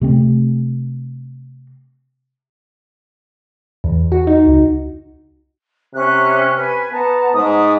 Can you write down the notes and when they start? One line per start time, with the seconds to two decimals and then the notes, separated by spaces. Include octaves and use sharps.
0.01 C3 A3 C4
3.84 E2
4.12 F#4
4.27 D#4
4.46 C#2
5.94 C3 C#4 E5 F#6
6.56 B4 G#5
6.92 B3 F#5 A5 A#5
7.33 G#2 D#6